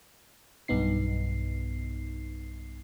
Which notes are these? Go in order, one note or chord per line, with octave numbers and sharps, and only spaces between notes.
B1 G2 B3 D#4 C7